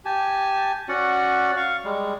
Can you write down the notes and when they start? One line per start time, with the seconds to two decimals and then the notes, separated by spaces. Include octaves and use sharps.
0.05 G4 G#5 A5
0.89 C#4 F#4 D5 F#5
1.56 F5 C#6
1.85 G3 G#3